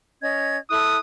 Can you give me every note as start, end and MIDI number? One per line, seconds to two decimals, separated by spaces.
0.22 0.56 61
0.22 0.56 75
0.22 0.56 92
0.70 0.97 64
0.70 0.97 69
0.70 0.98 87
0.70 0.97 90